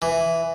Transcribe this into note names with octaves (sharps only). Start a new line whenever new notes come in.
E3